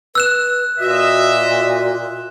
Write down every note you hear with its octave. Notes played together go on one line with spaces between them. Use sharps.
B4 E6 F#6 E7
A#2 F#4 D#5 E5